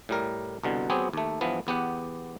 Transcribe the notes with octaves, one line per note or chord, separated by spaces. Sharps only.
A2 G3 A#4
C2 B2 D3
F#3 B3 C4 G4 G#4
D#2 A3
G2 E3 F3 B3
E2 B3 G4 F#5